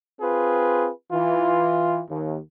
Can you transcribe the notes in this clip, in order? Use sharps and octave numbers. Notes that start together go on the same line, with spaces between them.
C4 F4 G#4 B4
E3 F4
D#2